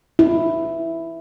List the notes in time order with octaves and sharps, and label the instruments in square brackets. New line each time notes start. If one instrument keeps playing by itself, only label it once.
[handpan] E4